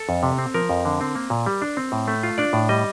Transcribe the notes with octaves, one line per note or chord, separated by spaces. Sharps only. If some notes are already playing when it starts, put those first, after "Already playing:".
Already playing: A4
F2
C3
C4
F3 A#4
F2
D3
C4
A#3
A#2
G3
D4
C4
A2
A3
F4
D4 D5
A2
G3 D#5